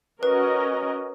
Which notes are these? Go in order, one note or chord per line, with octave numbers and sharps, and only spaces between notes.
C#4 F#4 A#4 B4 D#5